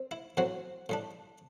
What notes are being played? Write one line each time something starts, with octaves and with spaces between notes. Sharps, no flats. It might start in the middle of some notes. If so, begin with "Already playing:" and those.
Already playing: C4
E4
A2 F#3 C4 F#4
A2 G3 D4